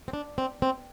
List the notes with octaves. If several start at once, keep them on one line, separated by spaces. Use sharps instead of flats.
C4
D4
C4
C4